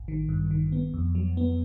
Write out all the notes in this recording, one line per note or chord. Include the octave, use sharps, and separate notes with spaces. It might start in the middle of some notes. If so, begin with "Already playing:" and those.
Already playing: A1
D#3
G2
D#3
B3
F2
F#3
B3